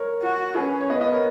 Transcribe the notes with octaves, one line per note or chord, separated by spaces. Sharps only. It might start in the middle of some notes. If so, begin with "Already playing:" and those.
Already playing: A#4 C#5
F#4
C#4 G#4 B4
C#5
B3 B4 D#5
B4 D#5
A#4 C#5